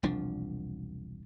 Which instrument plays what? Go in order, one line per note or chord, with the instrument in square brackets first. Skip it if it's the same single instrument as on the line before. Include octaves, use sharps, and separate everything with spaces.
[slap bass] E1 C2 F3 D4